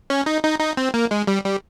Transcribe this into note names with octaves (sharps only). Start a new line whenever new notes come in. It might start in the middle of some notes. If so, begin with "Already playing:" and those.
C#4
D#4
D#4
D#4
C4
A#3
G#3
G3
G3